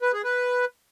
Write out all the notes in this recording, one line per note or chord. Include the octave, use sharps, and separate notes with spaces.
B4
G#4
B4